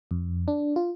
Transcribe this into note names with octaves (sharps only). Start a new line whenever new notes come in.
F2
D4
F4